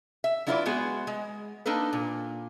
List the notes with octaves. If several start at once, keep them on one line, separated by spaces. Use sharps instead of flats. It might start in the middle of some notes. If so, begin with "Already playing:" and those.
E5
F#3 D4 E4 F4 B4 D5
G#3 B3 F#4 G#4
G#3
A#3 D4 D#4 A4 B4
A#2